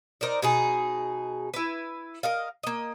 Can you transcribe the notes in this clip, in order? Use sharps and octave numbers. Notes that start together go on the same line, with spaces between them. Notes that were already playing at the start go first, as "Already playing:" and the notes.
D#4 A#4 C5 D5
B2 D#4 G#4
E4 B4
A#4 D#5 F5
A#3 D#5